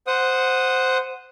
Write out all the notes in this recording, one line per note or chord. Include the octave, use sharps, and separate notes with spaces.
C5 F#5 D#6